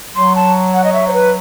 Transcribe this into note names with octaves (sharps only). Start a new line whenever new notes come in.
F#3 C6
A5
F#5
D#5
E5
C5
B4